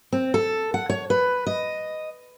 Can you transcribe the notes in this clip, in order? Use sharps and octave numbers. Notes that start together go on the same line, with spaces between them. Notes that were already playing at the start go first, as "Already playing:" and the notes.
C4
A4
F#5
C#5
B4
D#5